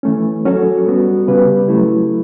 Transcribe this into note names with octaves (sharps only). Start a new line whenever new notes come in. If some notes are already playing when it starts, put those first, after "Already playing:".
E3 A3 C#4
F#3 C#4 F#4 A4
G3 B3 F#4
C#3 G3 C#4 G4 B4
F#3 A3 E4